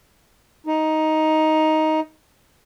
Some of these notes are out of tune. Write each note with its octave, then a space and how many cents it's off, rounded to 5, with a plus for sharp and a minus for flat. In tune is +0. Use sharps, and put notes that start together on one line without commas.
D#4 +10